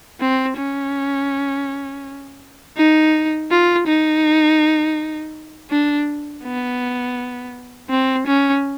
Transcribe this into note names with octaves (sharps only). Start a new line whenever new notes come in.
C4
C#4
D#4
F4
D#4
D4
B3
C4
C#4